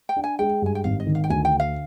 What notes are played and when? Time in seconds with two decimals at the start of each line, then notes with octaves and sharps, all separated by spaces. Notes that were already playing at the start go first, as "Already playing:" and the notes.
0.09 G5
0.16 D4
0.24 G#5
0.39 G#3 G5
0.62 G2 G#5
0.75 G5
0.84 G#1 F5
1.00 D#5
1.07 D#3
1.15 F5
1.24 G5
1.30 D2 G#5
1.45 G5
1.53 D3
1.60 F5